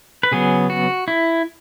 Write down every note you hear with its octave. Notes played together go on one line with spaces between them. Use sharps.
B4
C#3 F#3 B3 G#4
F#4
E4